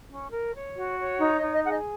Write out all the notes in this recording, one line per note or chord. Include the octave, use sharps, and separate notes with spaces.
C#4
A#4
C#5
F#4
C#5
D#4
D#5
D#4
D#5
G#4 F#5
D#5